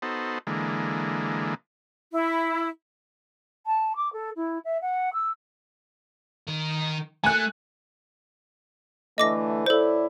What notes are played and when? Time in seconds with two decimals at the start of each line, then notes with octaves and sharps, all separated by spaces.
0.02 B3 D#4 F#4 A4 C5
0.47 D3 E3 G#3 A#3
2.11 E4
3.66 A5
3.95 D6
4.12 A4
4.36 E4
4.64 E5
4.81 F#5
5.13 E6
6.47 D#3 A#4
7.24 A3 G#5 F#6
9.18 D3 E3 A3 D#5 D6 A#6
9.66 A2 E4 A4 C5 D5